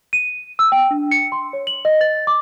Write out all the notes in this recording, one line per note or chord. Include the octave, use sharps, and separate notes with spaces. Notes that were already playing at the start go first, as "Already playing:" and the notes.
D#7
E6
G5
D4
C#7
C6
C#5
F#7
D#5
A6
D6